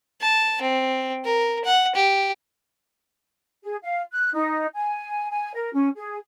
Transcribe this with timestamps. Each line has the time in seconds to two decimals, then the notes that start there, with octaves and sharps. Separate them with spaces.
0.21 A5
0.62 C4
1.25 A#4
1.65 F#5
1.95 G4
3.63 G#4
3.82 F5
4.11 F#6
4.33 D#4
4.74 G#5
5.29 G#5
5.54 A#4
5.72 C#4
5.95 G#4